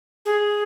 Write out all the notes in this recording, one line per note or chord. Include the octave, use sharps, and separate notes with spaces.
G#4